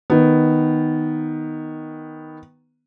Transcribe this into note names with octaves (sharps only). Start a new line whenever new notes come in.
D#3 B3